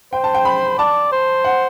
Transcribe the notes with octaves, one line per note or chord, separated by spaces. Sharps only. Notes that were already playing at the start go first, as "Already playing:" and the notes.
C5 G5
A5
G5
B5
D5 A5
C5
F#5